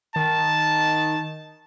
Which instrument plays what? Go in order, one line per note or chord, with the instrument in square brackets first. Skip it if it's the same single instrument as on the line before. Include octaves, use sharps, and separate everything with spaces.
[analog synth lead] D#3 [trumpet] A5